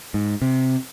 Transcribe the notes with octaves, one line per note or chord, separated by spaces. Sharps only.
G#2
C3